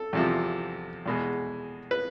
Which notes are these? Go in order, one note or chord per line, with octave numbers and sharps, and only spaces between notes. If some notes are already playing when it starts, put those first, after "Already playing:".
Already playing: A4
E2 C3 F3
E2 B2 G#3
B4